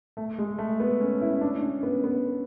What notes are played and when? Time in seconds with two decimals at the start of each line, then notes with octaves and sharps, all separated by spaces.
0.17 A3
0.38 G#3
0.59 A3
0.80 B3
1.01 C#4
1.22 E4
1.41 D4
1.62 C#4
1.83 B3
2.04 B3